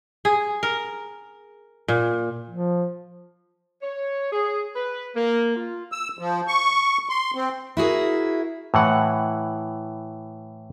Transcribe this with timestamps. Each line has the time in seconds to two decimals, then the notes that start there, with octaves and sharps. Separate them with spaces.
0.25 G#4
0.63 A#4
1.88 A#2
2.50 F3
3.82 C#5
4.30 G#4
4.75 B4
5.14 A#3
5.55 F4
5.92 E6
6.19 F3
6.48 C#6
7.09 C6
7.35 C4
7.77 E4 F#4 G#4 A#4
8.74 A2 E3 F#5